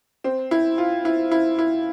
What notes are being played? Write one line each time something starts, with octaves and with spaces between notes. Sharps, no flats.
C4
E4
F4
E4
E4
E4